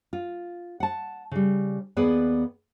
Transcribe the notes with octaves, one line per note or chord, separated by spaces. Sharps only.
F4
F#5 A5
C#3 G3
D#2 B3 G#4 B4 D5